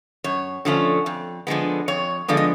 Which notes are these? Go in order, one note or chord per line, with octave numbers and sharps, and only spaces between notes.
F#2 C#5
D3 F3 A3 C#4
F2
D3 F3 G#3 B3
F2 C#5
D3 F3 G#3 B3 D5
D#5